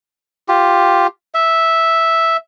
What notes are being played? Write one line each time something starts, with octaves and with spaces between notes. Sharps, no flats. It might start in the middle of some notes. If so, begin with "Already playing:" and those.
F4 G4
E5